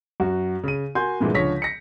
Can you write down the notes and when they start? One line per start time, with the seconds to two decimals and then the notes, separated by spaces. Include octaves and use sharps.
0.20 F#2 F#4
0.64 C#3 D#7
0.95 F#4 A#4 G#5 C6 G6
1.20 G2 A#2 D3 E3 G#3
1.34 C#2 D3 F3 C#5 A#6 B6
1.62 A#6 C#7